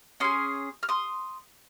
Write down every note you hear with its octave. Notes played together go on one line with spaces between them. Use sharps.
C#4 G#4 C6 D#6
F6
C6 D#6